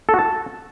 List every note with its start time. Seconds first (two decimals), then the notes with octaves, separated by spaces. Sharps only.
0.09 A4
0.14 F#4
0.19 A5